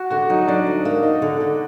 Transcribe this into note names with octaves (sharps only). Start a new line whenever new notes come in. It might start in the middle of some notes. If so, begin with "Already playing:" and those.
Already playing: F#4
D3 F#4
F#3 D#4
F#3 D4
D2
A#3
D#4
D3
D3